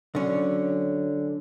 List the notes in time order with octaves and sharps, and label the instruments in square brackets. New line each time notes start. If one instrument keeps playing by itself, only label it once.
[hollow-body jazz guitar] D3 C#4 [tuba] F#3